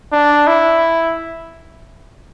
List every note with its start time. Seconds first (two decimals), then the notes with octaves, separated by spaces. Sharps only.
0.13 D4
0.48 E4